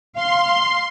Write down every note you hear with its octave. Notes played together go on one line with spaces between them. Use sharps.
F5 C6